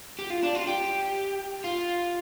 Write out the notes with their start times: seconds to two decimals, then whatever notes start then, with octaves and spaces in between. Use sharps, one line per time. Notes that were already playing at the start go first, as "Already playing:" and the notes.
0.19 G4
0.30 F4
0.43 D4
0.55 F4
0.67 G4
1.64 F4